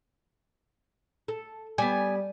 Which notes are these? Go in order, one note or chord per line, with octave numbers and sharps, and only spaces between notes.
A4
G3 B3 G#5